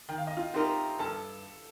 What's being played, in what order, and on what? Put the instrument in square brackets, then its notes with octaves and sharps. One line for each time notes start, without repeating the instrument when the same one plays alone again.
[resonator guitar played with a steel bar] D#3 [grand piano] G5
[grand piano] F5
D#5
F4 F5
[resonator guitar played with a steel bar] A3 C4 D#4 A#4 [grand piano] G4 G5
[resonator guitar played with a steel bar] G2 [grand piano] A4 A5